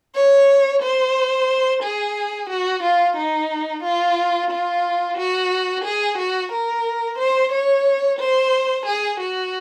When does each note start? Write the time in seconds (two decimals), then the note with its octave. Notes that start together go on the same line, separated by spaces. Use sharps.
0.15 C#5
0.83 C5
1.83 G#4
2.50 F#4
2.83 F4
3.17 D#4
3.84 F4
4.51 F4
5.18 F#4
5.85 G#4
6.18 F#4
6.52 A#4
7.19 C5
7.52 C#5
8.19 C5
8.86 G#4
9.20 F#4